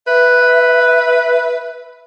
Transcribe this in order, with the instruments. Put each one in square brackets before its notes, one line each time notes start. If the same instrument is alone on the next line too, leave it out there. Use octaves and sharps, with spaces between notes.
[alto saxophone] B4 [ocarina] E5